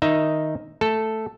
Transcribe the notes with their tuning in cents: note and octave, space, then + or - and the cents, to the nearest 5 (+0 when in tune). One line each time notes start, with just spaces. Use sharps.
D#3 +0 D#4 +0 E5 +0
A3 +0 A4 +0